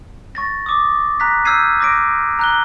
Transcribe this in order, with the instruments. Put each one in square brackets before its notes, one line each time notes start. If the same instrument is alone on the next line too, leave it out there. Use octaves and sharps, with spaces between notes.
[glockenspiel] C#6 A6 A#6
D6 D#6
A#5 F#6 A#6 B6
E6 F6 G6 G#6 C7 D#7
D6 A#6 D7
A#5 F#6 G7